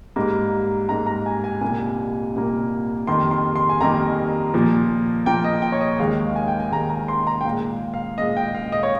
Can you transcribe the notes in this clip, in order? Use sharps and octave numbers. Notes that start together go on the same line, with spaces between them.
G#2 G3 A#3
G#2 G3 A#3 A#5
A#5
G#5
G#5
C2 A#2 G3 A#3 G#5
C2 A#2 G3 A#3
F2 D#3 G3 A#3 C6
C6
C6
G#5
F2 D#3 G3 A#3 A#5
A#2 F3 A#3
A#2 F3 A#3 G5
D#5
G5
C#5
D#5
D#2 D#3 G#3 F5
G#5
G5
G#5
D#2 D#3 G#3 A#5
A#5
C6
A#5
G5
A#2 G#3 F5
F5
A#2 G#3 D#5
G5
F5
D#5
C#5